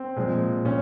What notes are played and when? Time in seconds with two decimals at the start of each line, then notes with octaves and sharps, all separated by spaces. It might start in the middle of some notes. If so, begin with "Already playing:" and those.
Already playing: C4
0.16 A#2 F3 G#3
0.65 A#2 C#4